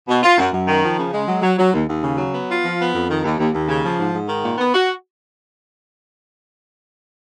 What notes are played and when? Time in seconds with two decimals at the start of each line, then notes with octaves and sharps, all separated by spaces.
0.08 B2
0.23 F4
0.38 F#2
0.52 F#2
0.68 D#3
0.83 F3
0.98 C#3
1.12 G#3
1.28 F#3
1.42 F#3
1.58 F#3
1.73 D#2
1.88 D#2
2.03 C#3
2.18 F#3
2.33 B3
2.48 F4
2.63 F3
2.79 B3
2.94 F2
3.09 D#3
3.24 D#2
3.38 D#2
3.53 D#2
3.68 C#3
3.84 F3
3.99 G#2
4.14 G#2
4.29 D#3
4.44 A#2
4.58 B3
4.74 F#4